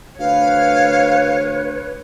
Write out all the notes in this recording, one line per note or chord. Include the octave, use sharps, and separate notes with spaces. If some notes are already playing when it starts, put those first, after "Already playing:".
D2 B4 C#5 F5